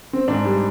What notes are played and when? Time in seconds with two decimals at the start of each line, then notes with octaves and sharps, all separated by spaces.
0.13 C4
0.28 G#2 D4
0.45 G3